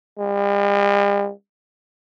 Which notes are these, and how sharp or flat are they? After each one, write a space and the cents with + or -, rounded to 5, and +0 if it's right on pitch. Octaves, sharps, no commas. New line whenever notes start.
G3 +45